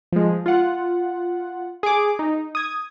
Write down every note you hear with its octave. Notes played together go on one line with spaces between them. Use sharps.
F3 G#3
F4 F#5
G#4 D6
D#4
D#6 G#6